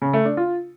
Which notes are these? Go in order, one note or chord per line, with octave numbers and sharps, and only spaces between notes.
C#3
A3
D4
F4